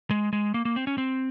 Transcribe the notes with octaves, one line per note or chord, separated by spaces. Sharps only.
G#3
G#3
A#3
A#3
C4
C#4
C4